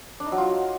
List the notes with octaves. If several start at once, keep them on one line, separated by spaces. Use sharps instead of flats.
D4
D#4
F#3
F4